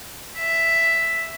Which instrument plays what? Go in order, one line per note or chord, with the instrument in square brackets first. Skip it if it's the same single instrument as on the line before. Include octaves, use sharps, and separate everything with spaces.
[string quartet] E5